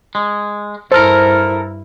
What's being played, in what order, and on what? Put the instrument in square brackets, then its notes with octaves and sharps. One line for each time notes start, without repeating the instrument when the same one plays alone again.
[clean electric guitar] G#3
[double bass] G2 E4 [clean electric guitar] A4 A#4 [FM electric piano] C5 F6